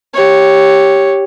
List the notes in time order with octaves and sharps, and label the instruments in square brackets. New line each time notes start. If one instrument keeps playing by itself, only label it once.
[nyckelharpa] G4 C#5